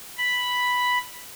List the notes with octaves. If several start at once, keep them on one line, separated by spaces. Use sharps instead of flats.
B5